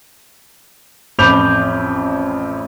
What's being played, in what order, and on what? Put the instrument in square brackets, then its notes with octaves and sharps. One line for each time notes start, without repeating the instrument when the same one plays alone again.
[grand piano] A1 F2 B5 D6 G6 F7